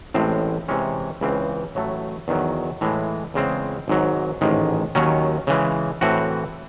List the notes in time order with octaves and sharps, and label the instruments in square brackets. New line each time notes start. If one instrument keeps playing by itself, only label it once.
[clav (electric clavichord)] A1 A2 G#3 C4
C3 E3 G#3 C#4
C#2 C#3 E3 C4
A1 A2 F#3 A3
E2 D#3 F#3
A2 E3 G#3
E2 C#3 G#3 C4
G#1 G#2 F#3
A1 G#2 D#3 G#3
D#2 D#3 F#3 C#4
C#3 E3 G#3
A2 E3 C4 F#4